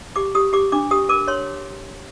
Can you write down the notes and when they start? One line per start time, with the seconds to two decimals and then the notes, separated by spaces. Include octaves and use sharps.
0.16 G4 D6
0.35 G4 D#6
0.53 G4 D6
0.72 D4 D6
0.91 G4 D#6
1.09 A#4 D6
1.28 C#5 C6